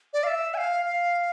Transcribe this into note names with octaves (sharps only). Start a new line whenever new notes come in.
D5
F5
E5
G#5
F5
F5